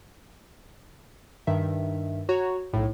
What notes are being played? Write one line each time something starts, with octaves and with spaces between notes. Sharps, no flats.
G2 D#3 E5
F#4 C#5 A#5
B1 A2